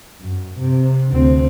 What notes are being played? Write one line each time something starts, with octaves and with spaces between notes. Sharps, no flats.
F#2
C3
D2 C4